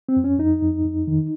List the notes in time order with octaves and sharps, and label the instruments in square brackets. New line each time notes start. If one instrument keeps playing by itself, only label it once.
[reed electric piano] C4
F2
C#4
F2 D#4
F2
F2
D#3